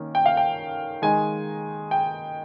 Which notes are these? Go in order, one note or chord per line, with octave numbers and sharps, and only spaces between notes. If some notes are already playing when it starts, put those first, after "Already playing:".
Already playing: D#3 A#3 C#4
G5
F5
G5
D#3 G#3 D#4 G#5
G5